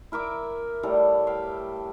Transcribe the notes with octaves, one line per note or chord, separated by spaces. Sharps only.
E4 A#4 E5 D6
A2 G3 A4 A#5
E5 F5 G5